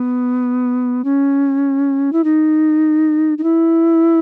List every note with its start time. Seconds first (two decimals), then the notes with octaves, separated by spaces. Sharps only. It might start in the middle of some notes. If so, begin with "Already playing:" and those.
Already playing: B3
1.05 C#4
2.13 E4
2.24 D#4
3.38 D#4
3.43 E4